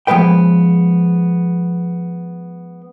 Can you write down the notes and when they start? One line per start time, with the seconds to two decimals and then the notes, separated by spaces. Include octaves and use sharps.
0.07 F3 G#3 B3 B4 G5